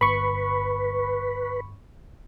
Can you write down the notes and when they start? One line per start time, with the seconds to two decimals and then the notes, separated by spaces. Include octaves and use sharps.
0.01 G1 B4 B5 C#6